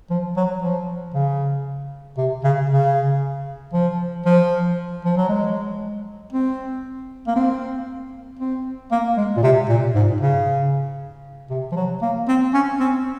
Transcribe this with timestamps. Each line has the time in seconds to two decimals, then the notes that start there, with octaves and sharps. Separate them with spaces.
0.10 F3
0.37 F#3
0.62 F3
1.14 C#3
2.18 C3
2.44 C#3
2.70 C#3
3.73 F3
4.25 F3
5.05 F3
5.17 F#3
5.29 G#3
6.32 C4
7.27 A#3
7.36 C4
8.39 C4
8.92 A#3
9.17 G#3
9.37 A#2
9.43 C3
9.69 A#2
9.95 G#2
10.21 C#3
11.50 C3
11.72 F3
11.76 F#3
12.02 A#3
12.28 C4
12.54 C#4
12.80 C4